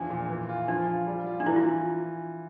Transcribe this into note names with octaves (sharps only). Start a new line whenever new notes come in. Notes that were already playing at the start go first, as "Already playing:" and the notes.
Already playing: E2 F3 D4
A#2
E3
F4
F3 D4
F4
G3
F4
D4
E3 E4
F4